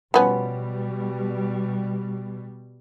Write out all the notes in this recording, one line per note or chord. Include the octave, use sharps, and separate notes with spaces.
B2 F3 G3 B3 C#4